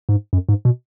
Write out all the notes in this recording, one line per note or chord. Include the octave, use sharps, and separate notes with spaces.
G#2
F#2
G#2
B2